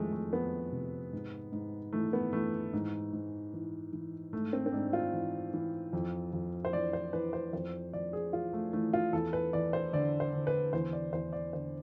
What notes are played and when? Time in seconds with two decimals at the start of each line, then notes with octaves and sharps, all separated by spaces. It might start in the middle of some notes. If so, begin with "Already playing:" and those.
Already playing: F2 E3 G#3 A3
0.12 A3
0.33 F2 B3
0.72 C3
1.13 G#2
1.52 G#2
1.93 E3 A3
2.13 B3
2.33 E3 A3
2.73 G#2
3.13 G#2
3.54 E3
3.93 E3
4.33 G#2 A3
4.53 C4
4.66 C4
4.72 G#2 D4
4.93 F4
5.13 E3
5.54 E3
5.93 F2
6.33 F2
6.65 C5
6.73 E3 D5
6.93 C5
7.13 E3 B4
7.33 C5
7.53 F2 C5
7.93 F2 D5
8.13 G#4
8.33 E3 F4
8.53 A3
8.73 E3 A3
8.93 F4
9.13 E2 A4
9.33 B4
9.53 E2 D5
9.73 C5
9.93 D3 D5
10.20 C5
10.33 D3
10.47 B4
10.73 E2 C5
10.93 D5
11.13 E2 C5
11.33 D5
11.53 D3 C5